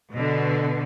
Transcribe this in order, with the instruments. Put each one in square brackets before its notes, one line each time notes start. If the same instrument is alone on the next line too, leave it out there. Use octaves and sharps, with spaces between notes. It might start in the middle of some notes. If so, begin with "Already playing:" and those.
[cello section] B2 D3